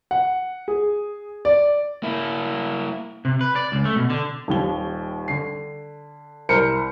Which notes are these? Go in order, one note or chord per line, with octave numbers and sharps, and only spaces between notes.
F#5
G#4
D5
A#3 E4
C3
B4
D5
C#2
A3
B2
D3
D#1 D#2 G7
D3 C7
C2 A#4 C5 C#7